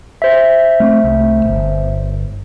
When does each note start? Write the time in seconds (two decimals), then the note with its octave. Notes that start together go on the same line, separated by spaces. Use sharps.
0.22 C5 E5
0.80 A3 A#3 C4
1.04 C2 A3
1.45 G1